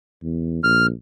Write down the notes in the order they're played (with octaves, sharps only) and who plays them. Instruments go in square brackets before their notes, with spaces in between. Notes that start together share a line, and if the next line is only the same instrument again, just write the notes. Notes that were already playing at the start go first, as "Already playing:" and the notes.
[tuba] E2
[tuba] A#1 [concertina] F6